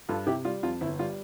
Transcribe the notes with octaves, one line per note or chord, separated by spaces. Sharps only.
G2 F4 A4
C3 E4 G4
G3 F4
F2 F4
G1 E4
G3 F4